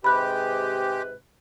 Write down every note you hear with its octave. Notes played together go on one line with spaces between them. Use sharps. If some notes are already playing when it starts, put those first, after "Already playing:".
G#2 C3 G#3 G4 B4 B5 F#6